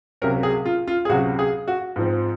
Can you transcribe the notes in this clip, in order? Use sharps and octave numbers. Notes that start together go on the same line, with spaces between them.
C#2 C3 F#3 C#4 A#4
G#4
F4
F4
G#4
C#2 C3 F#3 C#4 F#4
G#4
F#4
G#2 F3 C4